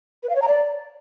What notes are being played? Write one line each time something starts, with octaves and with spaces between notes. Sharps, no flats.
B4
F5
C#5
A#5
D5